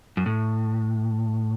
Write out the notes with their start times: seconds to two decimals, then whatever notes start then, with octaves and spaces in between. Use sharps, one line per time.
0.17 F#2
0.26 A2